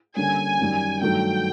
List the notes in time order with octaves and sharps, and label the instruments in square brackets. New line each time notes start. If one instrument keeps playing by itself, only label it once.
[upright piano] D3 G3 A#3 C#4 [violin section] G#5
[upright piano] F#2 D#3 G3
[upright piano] G2 D#3 F#3 A3 [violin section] G5